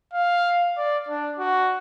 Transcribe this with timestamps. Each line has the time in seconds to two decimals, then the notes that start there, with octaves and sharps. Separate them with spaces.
0.13 F5
0.78 D5
1.09 D4
1.39 F#4